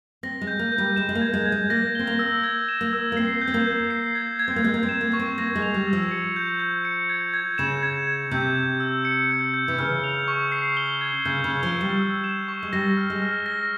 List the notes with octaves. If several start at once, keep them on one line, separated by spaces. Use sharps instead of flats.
C4 A#6
G#3
G6
A#3
G6
G3
G#3 E7
G#3
A#3
G#6
G#3
G#6
G#3
A#3 A#6
C4 G7
A#3
E6
G#6
E7
A#3
E6
A#3
C4 C7
G6
C4
A#3
G6
C7
G#6
G#6
C4
A#3
G#3 G6
A#3
C4
E7
A#3
A#3 C#6
C4
A#3 A#6
G#3
F7
G3
E6
F3
C#7
G6
G6
C#7
G#6
G#6
C#3 E7
G#6
G#6
C3 G6
E7
E6
C#7
G6
G6
E3
C#3 F6
F7
C#6
C7
G7
G#6
C#3 G6
C#3
G7
F3
E6
G3
E6
E7
C#6
G#3
G3 A#6
F6
G#3
F6
A#6